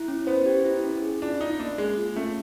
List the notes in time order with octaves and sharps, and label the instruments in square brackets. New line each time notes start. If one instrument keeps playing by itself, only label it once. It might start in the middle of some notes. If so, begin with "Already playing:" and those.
Already playing: [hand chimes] E4
C#4
[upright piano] B3 [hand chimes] C5
[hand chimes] G4
E4
C#4
G#4
[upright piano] D4 [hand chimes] F4
[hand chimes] C#4 [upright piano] D#4
[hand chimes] A#3 [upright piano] D4
[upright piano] G#3 [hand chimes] G#4
[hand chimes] F4
[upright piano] A3 [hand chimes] C#4